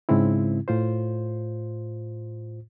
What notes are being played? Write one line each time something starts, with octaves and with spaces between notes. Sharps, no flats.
G#2 C#3 G#3 C4 E4
A2 F4 C5